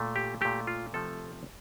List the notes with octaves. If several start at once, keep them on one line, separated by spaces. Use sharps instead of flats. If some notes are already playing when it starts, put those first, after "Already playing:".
Already playing: A#2 A3
G4
A#2 A3 G4
F4
C3 F3 A3 A4